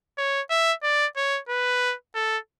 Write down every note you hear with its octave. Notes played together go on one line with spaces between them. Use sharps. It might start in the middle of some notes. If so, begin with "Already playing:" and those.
C#5
E5
D5
C#5
B4
A4